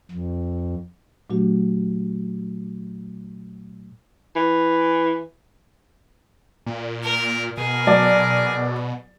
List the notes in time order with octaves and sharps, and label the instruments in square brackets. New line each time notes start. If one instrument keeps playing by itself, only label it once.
[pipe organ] F2
[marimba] A#2 F#3 A3 D4 F#4 G4
[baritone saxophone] E3
[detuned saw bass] A#2
[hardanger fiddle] A#4
[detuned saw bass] B2 [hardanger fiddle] G#4 [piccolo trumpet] A#4
[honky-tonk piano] F#3 D5 A5